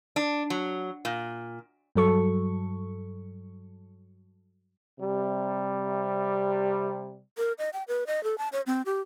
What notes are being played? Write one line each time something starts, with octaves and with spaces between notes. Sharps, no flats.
D4
F#3
A#2
G2 F#3 A4 C#6
C3 G3
A#4
D#5
G5
B4
D#5
A4
A5
C#5
C4
G4